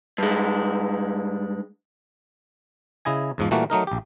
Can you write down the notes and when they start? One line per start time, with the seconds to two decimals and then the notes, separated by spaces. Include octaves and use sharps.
0.18 G2 G#3
3.05 C#3 E4 D#5 G#5
3.38 E2 G#2 F3
3.51 A#2 E3 G3 A3 A#3 F#4
3.70 F#3 A3 D#4 A#4
3.87 A#1 G4